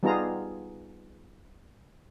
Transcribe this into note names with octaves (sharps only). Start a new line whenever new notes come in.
G3 B3 D#4 F4 G#4 A#5